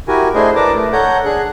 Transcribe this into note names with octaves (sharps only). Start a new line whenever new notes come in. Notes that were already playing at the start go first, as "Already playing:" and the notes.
E4 F#4 G4 A#4 G#5
A3 D4 E4 G#4 C5 D#5
A#4 B4 D5 A5 A#5 D6
A3
A4 C#5 F#5 A#5 G6
D4 G#4 F#6